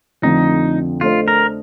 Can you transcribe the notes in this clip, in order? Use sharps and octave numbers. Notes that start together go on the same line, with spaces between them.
F2 D3 A3 C4 D#4 F4
A3 D4 F4 A4 C5 D#5
A#4